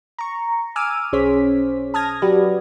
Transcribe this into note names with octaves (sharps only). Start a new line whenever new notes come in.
A#5 C#6
G#5 D6 E6 F6 D#7
B1 C#4 G#4 C5 C#5 B6
A5 D#6 F6 G#6 A#6
F#3 F#4 G4 B4 D5